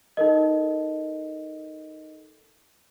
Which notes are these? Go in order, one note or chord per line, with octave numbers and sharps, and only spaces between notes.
D#4 A4 A#4 D#5